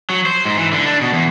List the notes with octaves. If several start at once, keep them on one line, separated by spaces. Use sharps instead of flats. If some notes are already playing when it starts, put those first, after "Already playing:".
F#3
C5
G#2
E3
D3
D4
B2
E2